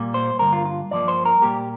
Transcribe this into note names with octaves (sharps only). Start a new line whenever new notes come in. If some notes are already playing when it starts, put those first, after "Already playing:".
Already playing: A#2 G3 A#3
C5
G2 D3 G3 A#3 A#4
F4
F4
G2 F3 A#3 D5
C5
A#4
A#2 G3 A#3 G4